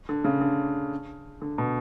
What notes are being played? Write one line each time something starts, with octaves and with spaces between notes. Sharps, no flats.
D3
C#3
D3
D3
B2